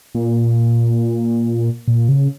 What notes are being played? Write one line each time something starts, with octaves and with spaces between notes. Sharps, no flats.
A#2
A#2
C#3